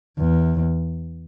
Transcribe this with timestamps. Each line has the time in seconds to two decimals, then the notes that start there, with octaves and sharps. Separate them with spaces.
0.18 E2